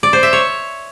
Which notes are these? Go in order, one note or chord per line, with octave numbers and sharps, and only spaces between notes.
D5
C5
E5
C#5